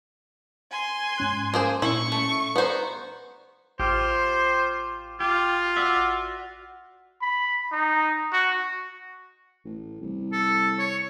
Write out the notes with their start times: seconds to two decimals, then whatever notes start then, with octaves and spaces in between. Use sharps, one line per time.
0.72 G#5 C6
1.18 G#2 C#4 F#6
1.54 A#3 G#4 A#4 C5
1.82 A#2 C#4 E4 C#6
2.12 A3
2.56 B3 B4 C5 D5 A#5
3.80 A1 F4 G4 C5
5.20 F4 G4
5.76 F#4 D5 E5
7.21 B5
7.72 D#4
8.33 F#4
9.65 A1
10.02 C2
10.32 A4
10.79 C#5